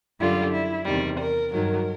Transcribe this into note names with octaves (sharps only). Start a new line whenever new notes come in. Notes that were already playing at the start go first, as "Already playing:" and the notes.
F#2 D3 G3 F4
E4
E2 C3 D#3 G3
A#4
G2 D#3 F#3 A#4